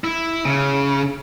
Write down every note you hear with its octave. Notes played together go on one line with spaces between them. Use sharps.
E4
C#3